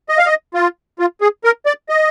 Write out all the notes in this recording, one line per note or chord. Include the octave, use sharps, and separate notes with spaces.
D#5
F5
D#5
F4
F4
G#4
A#4
D5
D#5